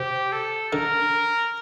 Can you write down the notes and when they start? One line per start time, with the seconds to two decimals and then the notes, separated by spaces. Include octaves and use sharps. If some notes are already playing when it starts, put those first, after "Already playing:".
Already playing: C3 G4
0.32 A4
0.73 D3 A#4